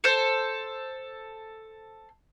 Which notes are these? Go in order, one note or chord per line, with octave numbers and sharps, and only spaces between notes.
A4 C5